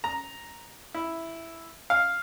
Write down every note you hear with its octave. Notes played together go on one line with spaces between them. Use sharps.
A#5
E4
F5